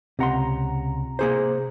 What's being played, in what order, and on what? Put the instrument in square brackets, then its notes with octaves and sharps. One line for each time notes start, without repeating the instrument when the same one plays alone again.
[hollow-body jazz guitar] C#2 F#5 C6 [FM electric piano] C3 A#5
[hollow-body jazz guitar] A#3 G#4 C5